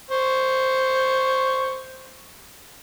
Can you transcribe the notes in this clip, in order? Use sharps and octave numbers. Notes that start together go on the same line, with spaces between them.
C5 C#6